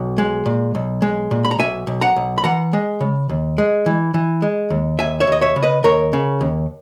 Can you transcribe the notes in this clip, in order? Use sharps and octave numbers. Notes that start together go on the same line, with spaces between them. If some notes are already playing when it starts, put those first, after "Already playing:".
Already playing: B1
G#3
A#2
B1
G#3
A#2
B5
A#5
B1 E5 G#5
B1
F#5 A#5
B1
B5
E3 F#5 A#5
G#3
C#3
D#2
G#3
E3
E3
G#3
D#2
D#2 E5 G#5
C#5 E5
D#2 D#5
C#5 E5
C#3
B4 D#5
D#2 A#4 C#5
C#3
D#2